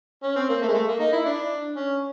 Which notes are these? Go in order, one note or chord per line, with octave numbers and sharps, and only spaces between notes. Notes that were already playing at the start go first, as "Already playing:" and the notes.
C#4
C4
A#3
A3
G#3
A3
A#3
D#4
E4
D4
C#4